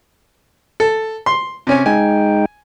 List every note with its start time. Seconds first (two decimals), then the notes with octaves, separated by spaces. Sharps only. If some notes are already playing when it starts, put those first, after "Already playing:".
0.80 A4
1.26 C6
1.67 C3 C#4 G#5
1.86 G#3 D#4 G5 G#5